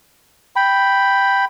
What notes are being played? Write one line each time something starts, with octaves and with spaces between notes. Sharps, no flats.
G5 B5